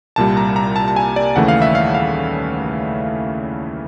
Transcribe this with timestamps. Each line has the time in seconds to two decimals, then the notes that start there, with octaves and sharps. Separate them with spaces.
0.16 C2 A#2 G3 A5
0.37 A#5
0.56 A#5
0.76 A5
0.88 A5
0.96 G#5
1.16 D5
1.36 D#2 C#3 E3 A3 F#5
1.48 F5
1.62 E5
1.75 F5
1.94 F5